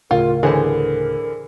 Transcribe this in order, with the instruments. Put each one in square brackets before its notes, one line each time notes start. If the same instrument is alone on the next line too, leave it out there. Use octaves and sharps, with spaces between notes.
[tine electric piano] D2 A2 C#3 [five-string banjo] F4 [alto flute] A#4
[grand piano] D3 E3 [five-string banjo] G#4 C5 A5 [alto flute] A#4